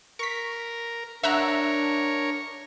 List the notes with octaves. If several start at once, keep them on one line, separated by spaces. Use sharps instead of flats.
A#4 C#6 B6
D4 A#4 C#5 E5 F#5 A#5